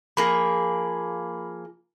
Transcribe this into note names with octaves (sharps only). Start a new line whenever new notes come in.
F3 A#3 G#4 B5